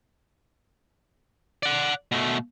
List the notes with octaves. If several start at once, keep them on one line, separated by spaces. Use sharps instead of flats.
D5 F#5
B2 A3